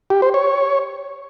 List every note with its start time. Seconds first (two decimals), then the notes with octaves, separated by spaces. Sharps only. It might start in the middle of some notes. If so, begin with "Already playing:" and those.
0.10 G4
0.22 C5
0.34 C#5